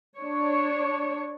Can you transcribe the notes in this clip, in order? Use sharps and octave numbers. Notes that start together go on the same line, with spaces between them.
D4 C#5